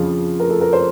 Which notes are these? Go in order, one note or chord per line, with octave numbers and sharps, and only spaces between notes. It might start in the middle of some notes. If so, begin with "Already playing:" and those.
Already playing: F2 C#3 F3 F4
A#4
A4
A#4
C5